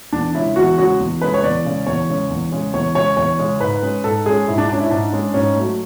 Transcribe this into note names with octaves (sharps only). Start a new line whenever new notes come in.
E2 D4
C#3 G#3 C#4 E4
E2 F#4
C#3 G#3 C#4 F#4
E2
C#3 G#3 C#4 B4
C#5
E2 D5
C#3 G#3 C#4
E2 C#5
C#3 G#3 C#4
E2
C#3 G#3 C#4
E2 C#5
C#3 G#3 C#4 C#5
E2 C#5
C#3 G#3 C#4
G#2 B4
G#3 C#4
G#2 A4
G#3 C#4 G#4
G#2 E4
D4
G#3 C#4 D4
E4
G#2 D4
G#3 C#4
G#2 C#4
F#3 A3